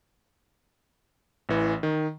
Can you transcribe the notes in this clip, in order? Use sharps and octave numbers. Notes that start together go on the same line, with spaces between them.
A1 E3
D#3